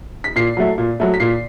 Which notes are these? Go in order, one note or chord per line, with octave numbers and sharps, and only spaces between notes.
B6
A#2 C7
F#3 A3
A#2
F#3 A3
B6
A#2 C7